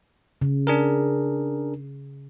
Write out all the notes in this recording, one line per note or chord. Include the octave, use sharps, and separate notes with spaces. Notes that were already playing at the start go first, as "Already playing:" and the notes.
C#3
D4 G#4 A#4